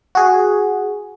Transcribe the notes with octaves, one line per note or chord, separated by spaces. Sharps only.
F#4 G#4